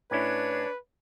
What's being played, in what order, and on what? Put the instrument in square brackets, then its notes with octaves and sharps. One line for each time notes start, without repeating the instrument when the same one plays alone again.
[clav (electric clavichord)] A2 C#4 E4 [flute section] D4 C#5 G#6 [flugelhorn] B4